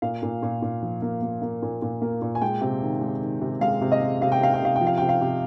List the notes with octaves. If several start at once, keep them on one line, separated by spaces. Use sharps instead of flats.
A#2 F5
A#2
A#2
A#2
F3
A#3
A#3
A#3
A#2
A#2
A#3
A#2
G#5
G#3 G5
C3
D#3
G#3
D#3
C3
G#3 F5
C3
D#5
G#3
C3 F5
G5
C3 F5
G5
C3 F5
G5
F3
F5
C3 G5
F5
C3